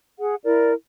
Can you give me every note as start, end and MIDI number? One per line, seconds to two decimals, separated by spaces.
0.19 0.36 68
0.19 0.36 78
0.45 0.72 64
0.45 0.72 70
0.45 0.72 74